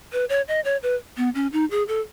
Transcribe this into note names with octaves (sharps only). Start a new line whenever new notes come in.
B4
C#5
D#5
C#5
B4
B3
C#4
D#4
G#4
A4